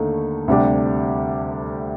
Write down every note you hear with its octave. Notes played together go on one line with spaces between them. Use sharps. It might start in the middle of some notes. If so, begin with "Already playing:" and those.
Already playing: D#2 D3 A3 D#4
D2 C3 G3 D4 G4